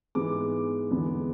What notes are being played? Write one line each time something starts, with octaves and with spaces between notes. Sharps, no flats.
G#2 E3 G#3 B3 D6
E2 D3 G#3 B3